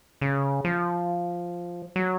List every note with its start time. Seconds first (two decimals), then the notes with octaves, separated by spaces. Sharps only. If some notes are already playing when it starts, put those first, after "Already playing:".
0.21 C#3
0.65 F3
1.96 F#3